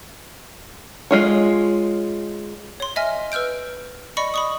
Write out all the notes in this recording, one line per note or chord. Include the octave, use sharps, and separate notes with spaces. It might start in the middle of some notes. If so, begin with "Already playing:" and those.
G#3 F4 C#5
C#5 C6
D#5 E5 G#5 F6
B4 E6 F6 G6 D7
D5 D#5 B5 C#6 C#7
B5 C#6 D#6